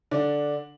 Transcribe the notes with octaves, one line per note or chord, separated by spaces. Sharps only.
D3 D4